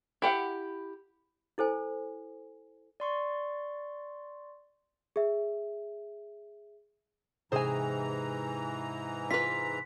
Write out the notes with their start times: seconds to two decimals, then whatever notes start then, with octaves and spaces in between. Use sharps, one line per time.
0.22 E4 G4 F#5
1.58 E4 A4 C5 G#5
3.00 D5 C6 C#6
5.16 G#4 E5
7.52 G#2 C3 E3 G#4 C5 G#5 A#5
9.31 F4 B4 C6 B6